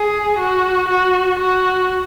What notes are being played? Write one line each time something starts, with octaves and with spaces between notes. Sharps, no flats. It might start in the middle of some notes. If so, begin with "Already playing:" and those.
Already playing: G#4
F#4
F#4
F#4